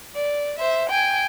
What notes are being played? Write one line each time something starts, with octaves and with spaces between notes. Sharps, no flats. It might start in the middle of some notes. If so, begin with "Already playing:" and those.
D5
C5 E5
G5 G#5